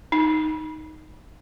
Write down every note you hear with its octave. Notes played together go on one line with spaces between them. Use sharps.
D#4